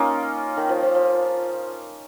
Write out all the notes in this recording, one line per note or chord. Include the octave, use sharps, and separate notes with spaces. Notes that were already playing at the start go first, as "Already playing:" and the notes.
Already playing: A#3 C#4 D#4 F4
D#3
F3
F3
F3